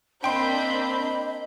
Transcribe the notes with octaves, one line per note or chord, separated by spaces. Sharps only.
A#3 C4 D4 D#5 G5 B5 C6 G6